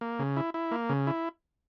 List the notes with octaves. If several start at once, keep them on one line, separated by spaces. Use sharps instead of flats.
A#3
C#3
E4
E4
A#3
C#3
E4